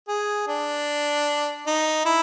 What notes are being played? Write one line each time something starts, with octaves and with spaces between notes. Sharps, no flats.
G#4
D4
D#4
E4